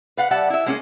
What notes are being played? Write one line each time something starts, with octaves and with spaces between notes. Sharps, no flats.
B4 F5 F#5
G3 E5 F#5 A5
E4 E5
G#3 A#3 C#4 G4 G#4